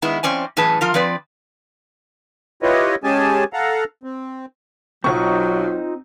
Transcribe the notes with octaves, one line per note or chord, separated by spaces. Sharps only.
D#3 G#3 B3 E4
F2 C4 C#4 D5 G#5
F#2 A2 E3 G#4 B4 A5
F3 F4 A#4
F3 C4 B4 D5
E4 F4 G4 B4 C#5 D#5
G#3 C#4 G4 G#4 G#5 A5
A4 F5 F#5 A#5
C4
B1 F#3 C4 D#4 F4 C#6